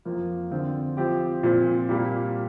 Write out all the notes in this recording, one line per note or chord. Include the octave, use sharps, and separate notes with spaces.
F2 F3 A#3
D3 F3 C4 F4
F3 C4 G4
A#2 F3 C4
A#2 G3 A#3 G4